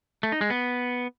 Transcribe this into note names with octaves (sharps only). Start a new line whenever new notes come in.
A3
D#4
G#3
B3